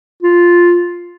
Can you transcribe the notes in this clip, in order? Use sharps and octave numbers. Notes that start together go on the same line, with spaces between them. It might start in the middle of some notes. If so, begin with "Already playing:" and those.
F4